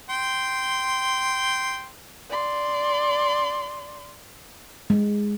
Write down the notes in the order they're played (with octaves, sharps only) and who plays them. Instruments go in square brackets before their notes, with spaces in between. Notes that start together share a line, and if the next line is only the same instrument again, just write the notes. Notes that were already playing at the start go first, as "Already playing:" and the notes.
[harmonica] G5 C6
[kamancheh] D5 C6
[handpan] G#3